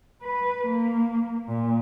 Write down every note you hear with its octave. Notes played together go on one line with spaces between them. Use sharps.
B4
A#3
A#2